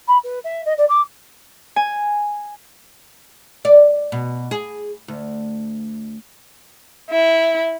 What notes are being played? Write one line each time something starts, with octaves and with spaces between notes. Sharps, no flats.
B5
B4
E5
D#5
D5
D6
G#5
D5
B2
G#4
D2
E4